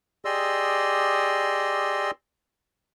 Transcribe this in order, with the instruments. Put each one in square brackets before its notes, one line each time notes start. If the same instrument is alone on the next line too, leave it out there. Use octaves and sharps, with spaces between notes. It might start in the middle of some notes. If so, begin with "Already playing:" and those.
[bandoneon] G4 G#4 D5 D#5 C6 E6